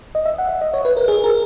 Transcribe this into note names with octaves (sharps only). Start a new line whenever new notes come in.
D#5
E5
F#5
E5
D#5
C#5
B4
A#4
G#4
A#4